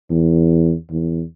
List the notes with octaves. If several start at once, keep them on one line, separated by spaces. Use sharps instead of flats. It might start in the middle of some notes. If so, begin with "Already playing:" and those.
E2
E2